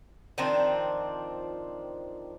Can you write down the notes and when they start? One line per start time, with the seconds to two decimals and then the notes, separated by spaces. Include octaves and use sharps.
0.38 D#3 F3 C4 D4